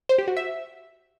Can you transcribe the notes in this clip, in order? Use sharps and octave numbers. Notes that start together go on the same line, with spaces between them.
C5
G4
F#4
E5